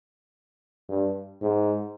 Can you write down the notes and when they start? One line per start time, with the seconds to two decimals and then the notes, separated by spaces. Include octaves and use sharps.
0.89 G2
1.41 G#2